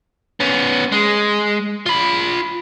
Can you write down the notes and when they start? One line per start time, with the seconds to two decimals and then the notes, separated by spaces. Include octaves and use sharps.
0.40 B3 C#4
0.92 G#3
1.86 F4 B5